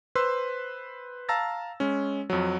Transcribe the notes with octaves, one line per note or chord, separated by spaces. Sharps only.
B4 C5 C6 E6
F5 A5 A#5 E6 A6 A#6
G#3 C#4
F2 F#3